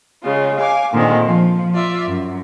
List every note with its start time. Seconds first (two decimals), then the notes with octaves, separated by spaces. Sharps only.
0.23 C#3 G#3 F4
0.58 F5 G#5 D6
0.93 A#2 D3 D#3 G#3 C4
1.25 F3
1.74 F4 D5 E5
2.05 F#2